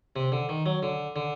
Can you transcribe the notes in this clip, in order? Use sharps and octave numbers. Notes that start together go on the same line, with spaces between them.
C3
D3
D#3
F#3
D3
D3